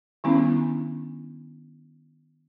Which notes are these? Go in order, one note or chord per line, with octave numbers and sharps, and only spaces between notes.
D#3 G3 B3 C#4 D4 E4